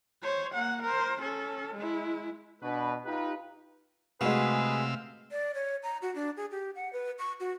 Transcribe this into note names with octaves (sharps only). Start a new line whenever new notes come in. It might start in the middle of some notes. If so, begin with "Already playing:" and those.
C5 C#5
A#3 F#5
A#4 C5
C#4 A4
G#3 E4
B2 D4 B4
D#4 F4 G4 B4
C3 G#3 A3 F#4 G#4 B4 F5 E6
D5
C#5
A#5
F#4
D4
G#4
G4
F#5
B4
C#6
F#4